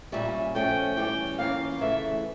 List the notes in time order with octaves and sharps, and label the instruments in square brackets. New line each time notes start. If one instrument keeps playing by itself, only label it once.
[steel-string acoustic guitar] A#2 G3 C#4 [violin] E5
[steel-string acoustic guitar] F3 A3 C#4 [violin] G5
[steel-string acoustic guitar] E3 G3 C#4 G4 [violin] G5
[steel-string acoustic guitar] E3 A#3 C#4 F4 A#4 [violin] F5
[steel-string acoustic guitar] D2 C#3 E3 A3 [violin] E5